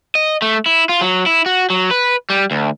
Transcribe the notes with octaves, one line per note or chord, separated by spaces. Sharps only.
D#5
A3
E4
F4
F#3
E4
F#4
F#3
B4
G3
D2